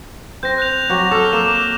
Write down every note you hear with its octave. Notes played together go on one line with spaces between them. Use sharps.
C4 G6 A#6
F#6 G6 F7
F#3 F#4 G4
A4 D6 F6
A#3 E7